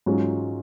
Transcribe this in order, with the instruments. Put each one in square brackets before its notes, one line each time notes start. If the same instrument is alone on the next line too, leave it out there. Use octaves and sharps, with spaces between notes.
[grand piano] G#2 F#3 C#4 F4 G#4